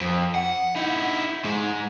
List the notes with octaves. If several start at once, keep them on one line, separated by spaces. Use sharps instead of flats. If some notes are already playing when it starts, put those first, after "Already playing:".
F2
F#5
D#4 E4
G#2 G#3